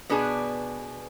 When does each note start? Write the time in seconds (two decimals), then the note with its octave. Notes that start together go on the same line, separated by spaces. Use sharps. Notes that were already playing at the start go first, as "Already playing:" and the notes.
0.09 B2 B3 D4 G#4